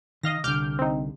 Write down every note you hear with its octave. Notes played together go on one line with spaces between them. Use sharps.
D#3 D#5 F5 A#6
C2 D3 D6 F6 G6
C4 D#4